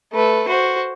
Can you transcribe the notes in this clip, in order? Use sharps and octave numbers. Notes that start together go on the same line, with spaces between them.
A3 B4
F#4 C5